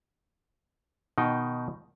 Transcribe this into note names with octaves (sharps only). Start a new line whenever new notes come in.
B2 D#3 D#4 G5